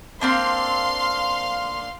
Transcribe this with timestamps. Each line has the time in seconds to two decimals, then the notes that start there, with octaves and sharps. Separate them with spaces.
0.21 A#3 C4 D4 F5 C6